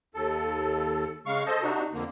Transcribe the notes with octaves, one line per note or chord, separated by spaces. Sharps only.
D#2 A4
C#3 G#3 F5 C#6
A4 C5 D#5
C3 D4 D#4 F#4
F2 D3 A#3